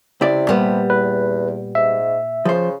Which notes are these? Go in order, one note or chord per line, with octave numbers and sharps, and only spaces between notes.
C#2 C3 E4 D5
A#2 G3 B3
E2 B4
G#2 E5
C#3 F3 C5